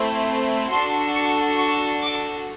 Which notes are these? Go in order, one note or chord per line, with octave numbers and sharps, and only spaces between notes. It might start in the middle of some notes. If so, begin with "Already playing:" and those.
Already playing: A3 C4 E4
D4 F#4 A4 C6
C#6
C#6
D6